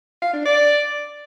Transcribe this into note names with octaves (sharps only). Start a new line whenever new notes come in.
F5
D4
D5